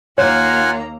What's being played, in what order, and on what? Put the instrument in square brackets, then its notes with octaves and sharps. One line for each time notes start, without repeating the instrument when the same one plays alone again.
[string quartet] D#2 A#3 A#5 [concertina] F4 F#5 G#5 [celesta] C#5